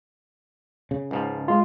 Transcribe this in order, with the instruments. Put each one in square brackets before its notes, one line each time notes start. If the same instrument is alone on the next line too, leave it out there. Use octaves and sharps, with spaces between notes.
[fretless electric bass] C#3
[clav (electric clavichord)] C#2 G#2 F3
[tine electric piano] G#3 F4